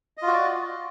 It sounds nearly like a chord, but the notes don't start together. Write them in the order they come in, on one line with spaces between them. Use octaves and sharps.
D#5 F4 F#4 D5